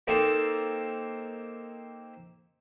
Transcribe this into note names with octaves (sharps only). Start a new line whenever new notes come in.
A#3 C4 D#4 A4